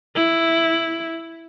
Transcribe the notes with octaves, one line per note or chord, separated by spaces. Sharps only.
E4